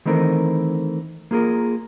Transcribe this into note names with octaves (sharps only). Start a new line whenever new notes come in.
D#3 E3 A3 C4 A#4
A#3 F4 G#4 A#4